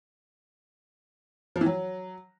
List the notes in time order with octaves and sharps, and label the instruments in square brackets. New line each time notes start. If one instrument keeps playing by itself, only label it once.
[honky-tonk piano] F3
E3
F#3